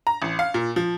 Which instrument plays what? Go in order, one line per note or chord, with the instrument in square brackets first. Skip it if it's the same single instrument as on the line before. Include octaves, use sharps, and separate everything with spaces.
[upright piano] A#5
A1
F5
A#2
F3